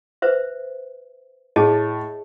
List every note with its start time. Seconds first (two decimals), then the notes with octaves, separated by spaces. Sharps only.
0.22 B4 C5 E5
1.56 A2 G#4 D#5 A5